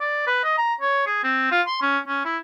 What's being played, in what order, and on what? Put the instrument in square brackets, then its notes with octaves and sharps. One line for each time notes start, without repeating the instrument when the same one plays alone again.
[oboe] D5
B4
D#5
A#5
C#5
G#4
C4
F4
C6
C#4
C#4
E4